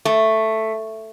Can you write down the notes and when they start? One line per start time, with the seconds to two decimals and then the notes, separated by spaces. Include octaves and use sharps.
0.05 A3